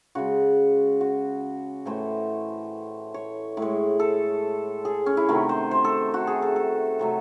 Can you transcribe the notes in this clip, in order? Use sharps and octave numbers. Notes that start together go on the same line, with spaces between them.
C#3 G#3 F#4
F#4
A2 E3 A3 C5
C#5
A2 G#3
A4
G#4
C#4
E4
C3 D#3 A3 F#4
C5
C5
A4
F#4
G#4
A4
A4
C3 F#3 A3